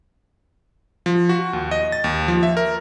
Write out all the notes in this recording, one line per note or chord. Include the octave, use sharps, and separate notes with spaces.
F3
F#4
D#2
D#5
A6
D#2
F3
E5
A#4